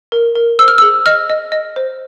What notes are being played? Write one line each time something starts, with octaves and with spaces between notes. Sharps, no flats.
A#4
A#4
C5 E6
F6
G#4 E6
D#5 F6
D#5
D#5
C5